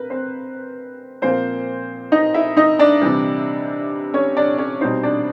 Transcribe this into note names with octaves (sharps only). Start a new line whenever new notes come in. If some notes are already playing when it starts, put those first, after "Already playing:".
Already playing: C4 A#4 B4
C4 C5
A#2 F3 A#3 C4 C5
D#4 D#5
E4 E5
D#4 D#5
D4 D5
C3 E3 G3
C#4 C#5
D4 D5
C#4 C#5
B2 G3 C4 D#4 C5
D4 D5